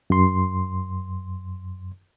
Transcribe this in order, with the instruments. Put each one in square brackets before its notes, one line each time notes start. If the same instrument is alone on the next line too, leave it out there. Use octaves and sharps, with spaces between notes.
[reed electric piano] F#2 C6